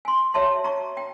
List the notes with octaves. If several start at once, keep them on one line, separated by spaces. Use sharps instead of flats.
G#5 C6
F#4 C#5 E5 A5 C6
A#5 C#6
G5